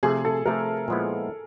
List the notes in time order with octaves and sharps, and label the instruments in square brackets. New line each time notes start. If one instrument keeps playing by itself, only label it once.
[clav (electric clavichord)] C3 F3 A3 [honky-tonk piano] G#4
[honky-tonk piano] A4
[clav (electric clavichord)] C3 F3 A3 [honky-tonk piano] A#4
[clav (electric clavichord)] A#2 F3 G#3 B3 E4